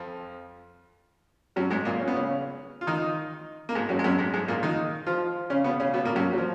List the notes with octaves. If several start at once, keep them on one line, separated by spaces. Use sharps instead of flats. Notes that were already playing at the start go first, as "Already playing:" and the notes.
Already playing: F2 F3
F#2 F#3
G#2 G#3
A#2 A#3
C#4
B3
C#3 C#4
F4
D#3 D#4
A#3
G#2 G#3
F#2 F#3
G#3
F#2 F#3
G#2 G#3
G#2 G#3
A#2 A#3
D#3 D#4
F3 F4
C#3 C#4
B2 B3
C#3 C#4
B2 B3
A#2 A#3
F#2 F#3
F#3
F3